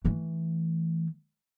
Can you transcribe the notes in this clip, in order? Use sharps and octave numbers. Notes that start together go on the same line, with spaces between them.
E3 A3